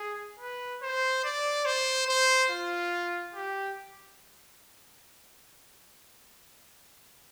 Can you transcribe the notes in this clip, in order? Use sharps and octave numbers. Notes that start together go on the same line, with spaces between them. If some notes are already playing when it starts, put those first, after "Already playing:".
Already playing: G#4
B4
C5
D5
C5
C5
F4
G4